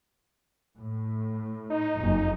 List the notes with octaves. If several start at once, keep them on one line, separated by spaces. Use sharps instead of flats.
A2
D#4
F#1 F2